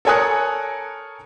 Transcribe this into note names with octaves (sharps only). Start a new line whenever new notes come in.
A4 A#4 C#5 G#5 D#6 F#6